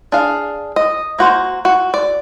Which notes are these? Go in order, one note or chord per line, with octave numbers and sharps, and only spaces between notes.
D4 G#4 F5
D#5
A#3 F#4 C5
F#4
D5